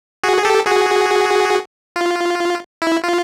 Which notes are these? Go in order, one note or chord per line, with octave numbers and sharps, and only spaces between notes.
F#4 G#4
G#4
G4 A4
F#4 G#4
F4
E4
F4